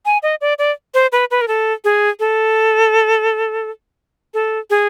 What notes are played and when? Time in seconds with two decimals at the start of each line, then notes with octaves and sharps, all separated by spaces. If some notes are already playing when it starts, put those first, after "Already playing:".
0.05 G#5
0.23 D#5
0.41 D5
0.59 D5
0.94 C5
1.12 B4
1.31 B4
1.41 A#4
1.48 A4
1.84 G#4
2.20 A4
4.34 A4
4.70 G#4